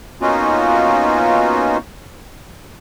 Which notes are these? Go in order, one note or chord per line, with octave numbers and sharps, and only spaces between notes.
A#3 B3 C#4 D#4 F4 F#4